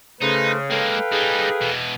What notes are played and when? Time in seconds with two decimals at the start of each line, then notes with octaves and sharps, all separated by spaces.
0.21 C#3 A3 D#4 B4 C5
0.70 G#3 A#3 A4 B4 F5 G5
1.12 G3 D#4 G#4
1.61 B2 E3